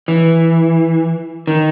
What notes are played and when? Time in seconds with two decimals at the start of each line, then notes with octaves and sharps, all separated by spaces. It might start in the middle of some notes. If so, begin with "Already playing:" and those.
0.08 E3
1.47 D#3